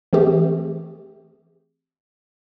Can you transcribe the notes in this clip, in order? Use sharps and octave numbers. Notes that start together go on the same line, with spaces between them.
E3 A3 C4 G4 G#4